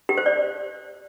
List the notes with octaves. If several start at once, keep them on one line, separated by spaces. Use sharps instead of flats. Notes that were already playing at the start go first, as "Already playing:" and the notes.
G4
C5
D5